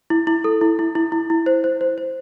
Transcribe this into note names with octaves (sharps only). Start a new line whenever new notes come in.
E4
E4
A4
E4
E4
E4
E4
E4
C5
C5
C5
C5